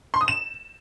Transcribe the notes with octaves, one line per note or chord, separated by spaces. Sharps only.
C6
D#6
E7